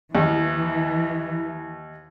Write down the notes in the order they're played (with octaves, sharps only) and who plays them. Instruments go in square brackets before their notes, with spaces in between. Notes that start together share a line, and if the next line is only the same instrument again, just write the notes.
[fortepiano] D#2 [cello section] E3